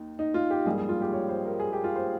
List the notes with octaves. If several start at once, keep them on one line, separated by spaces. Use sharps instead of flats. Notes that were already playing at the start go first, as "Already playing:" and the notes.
Already playing: D#2 D#4
D#4
F4
G4
A#1 G#2 G3 A#3 G#4
G#4
F4
G4
C#5
C5
A#4
G#4
G4
F4
C5